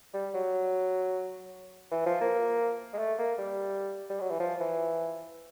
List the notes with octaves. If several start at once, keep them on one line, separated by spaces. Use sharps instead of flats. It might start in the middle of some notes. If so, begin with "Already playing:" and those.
G3
F#3
E3
F3
A#3
G#3
A3
A#3
G3
G3
F#3
E3
F3
E3